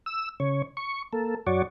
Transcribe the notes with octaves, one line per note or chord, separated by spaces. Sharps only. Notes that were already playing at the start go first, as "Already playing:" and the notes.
E6
C#3 C#5
C#6
A#3 A4
F#2 F#4 C#5 D5